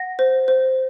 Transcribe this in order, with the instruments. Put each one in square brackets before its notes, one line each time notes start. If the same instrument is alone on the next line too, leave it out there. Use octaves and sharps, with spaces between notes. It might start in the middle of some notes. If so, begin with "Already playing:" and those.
Already playing: [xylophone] F#5 A#6
C5
C5